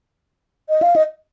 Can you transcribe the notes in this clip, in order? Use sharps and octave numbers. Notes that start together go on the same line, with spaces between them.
D#5
F5
D#5